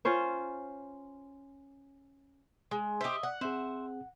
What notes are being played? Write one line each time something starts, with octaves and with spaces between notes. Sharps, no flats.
C#4 F4 C5 C#5
G#3
G4 C5 D#5 E5
F#5
C4 G#4 C5 E5